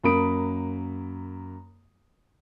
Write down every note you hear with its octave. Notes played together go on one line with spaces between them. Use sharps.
F#2 A#3 B5 D#6 D7